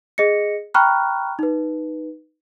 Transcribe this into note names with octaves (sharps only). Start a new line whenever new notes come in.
G#4 D#5 A#6 C#7
G5 A#5 B5 C#6 F6 F#6
D#4 B4